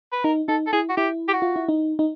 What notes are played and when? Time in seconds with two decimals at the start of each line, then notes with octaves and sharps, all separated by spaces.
0.13 B4
0.24 D#4 A#4
0.48 D#4 A4
0.67 A4
0.73 E4 G#4
0.89 F#4
0.97 E4 G4
1.28 G4
1.33 F#4
1.42 F4
1.56 E4
1.69 D#4
1.99 D#4